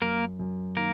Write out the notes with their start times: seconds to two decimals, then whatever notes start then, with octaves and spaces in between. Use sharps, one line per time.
0.02 F#2 A#3 A#4
0.39 F#2
0.77 D#3 A#3 A#4